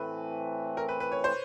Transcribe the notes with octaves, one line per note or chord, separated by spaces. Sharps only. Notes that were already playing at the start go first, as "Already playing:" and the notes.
Already playing: A2 E3 A3 C4 B4
A#4
B4
B4
C#5
C5